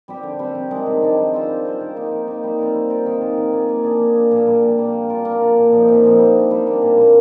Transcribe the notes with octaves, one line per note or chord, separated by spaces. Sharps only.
G3 C4 G4
D3
G3 C4 G4
C3
D#3 G#3 D4
C3
D#3 G#3 D4
G3
C4 F4 C5
G3
C4 F4 C5
D#3
A#3 D#4
D#3
A#3 D#4
G3
C4 F4 A#4
G3
C4 F4 A#4
D#3
A#3 F4 G#4
D#3
A#3 F4 G#4
A#3
D4 G#4
A#3
D4 G#4
A#2
G3 A#3
A#2
G3 A#3
A#3
D4 F4 A#4
A#3
D4 F4 A#4
A#2
F3 C4 D#4
A#2
F3 C4 D#4
G3
A#3 D4
G3
A#3 D4
A#2
G3 A#3